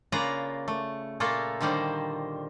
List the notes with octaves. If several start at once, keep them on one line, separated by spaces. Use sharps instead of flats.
C#3 A#3 F4 B4 D5 A#5
A3
A#2 A3 A#3 F4 A4
D3 D#3 G3 A#3 C5